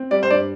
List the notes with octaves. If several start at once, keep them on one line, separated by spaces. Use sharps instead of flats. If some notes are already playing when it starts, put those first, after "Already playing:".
Already playing: C4
G3 D5
C5
G2 D5